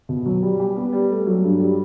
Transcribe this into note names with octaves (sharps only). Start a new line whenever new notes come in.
B2
F#3
G3
G4
B3
G3
A3
F#3
G2
G3